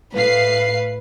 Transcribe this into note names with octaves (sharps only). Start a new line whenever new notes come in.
A2 B4 F5 C7